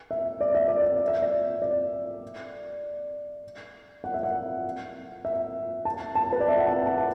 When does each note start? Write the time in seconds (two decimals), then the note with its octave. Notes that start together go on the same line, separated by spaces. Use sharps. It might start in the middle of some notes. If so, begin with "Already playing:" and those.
0.11 E5
0.41 D5
0.55 E5
0.68 D5
0.82 E5
0.96 D5
1.08 E5
1.22 D5
1.62 D5
4.04 F#5
4.14 E5
4.23 F#5
5.25 E5
5.85 A5
6.15 A5
6.32 B4
6.40 D5
6.49 E5
6.57 F#5
6.66 A5
6.86 A5
6.98 F#5